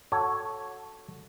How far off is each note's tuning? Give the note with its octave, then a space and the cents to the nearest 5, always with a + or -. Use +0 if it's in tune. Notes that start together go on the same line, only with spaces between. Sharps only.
F#4 -10 A4 +0 C#5 +0